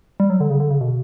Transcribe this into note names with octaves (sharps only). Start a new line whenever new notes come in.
G3
F#3
D3
C#3
D3
C#3
B2